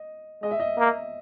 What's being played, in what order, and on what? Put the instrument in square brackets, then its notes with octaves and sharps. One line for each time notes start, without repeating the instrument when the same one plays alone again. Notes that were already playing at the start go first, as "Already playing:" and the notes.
Already playing: [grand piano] D#5
[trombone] G#3 [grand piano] D#5
[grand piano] E5
D#5
[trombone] A#3